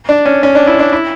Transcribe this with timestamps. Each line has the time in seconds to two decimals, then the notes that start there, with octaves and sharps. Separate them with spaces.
0.09 D4
0.26 C#4
0.43 C#4
0.55 D4
0.67 E4
0.79 D4
0.93 E4